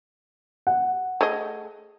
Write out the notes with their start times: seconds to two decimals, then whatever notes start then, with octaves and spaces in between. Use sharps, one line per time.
0.67 F#5
1.21 A3 G#4 D#5